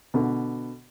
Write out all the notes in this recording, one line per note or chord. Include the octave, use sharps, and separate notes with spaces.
B2 D3